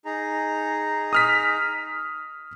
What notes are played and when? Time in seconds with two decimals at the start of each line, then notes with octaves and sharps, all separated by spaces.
0.05 D#4 G#4 A#5
1.13 D#6 F6 B6